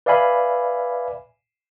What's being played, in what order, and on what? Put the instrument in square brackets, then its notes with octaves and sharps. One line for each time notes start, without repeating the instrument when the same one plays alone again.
[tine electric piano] B4 D5 E5 F5 G#5 B5